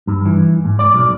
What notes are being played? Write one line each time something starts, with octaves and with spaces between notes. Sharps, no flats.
G2
E3
G#2
D5
B1